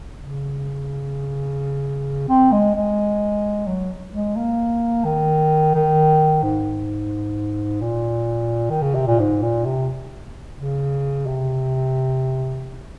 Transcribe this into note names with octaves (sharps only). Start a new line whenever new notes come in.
C#3
C4
G#3
G#3
F#3
G#3
A#3
D#3
D#3
G#2
A#2
D#3
C#3
C3
A#2
G#2
A#2
C3
C#3
C3